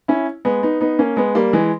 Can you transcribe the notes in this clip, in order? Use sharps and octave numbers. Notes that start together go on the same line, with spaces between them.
C#4 E4
G#3 B3
B3 D#4
B3 D#4
A#3 C#4
G#3 B3
G3 A#3
E3 G#3